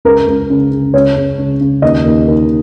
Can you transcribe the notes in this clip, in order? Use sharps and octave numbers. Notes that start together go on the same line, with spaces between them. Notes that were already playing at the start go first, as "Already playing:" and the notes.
C#2 A#4
C#2
C#3
C#3
C#2 C#5
C#2
C#3
C#3
D#2 D#5
D#2
D#3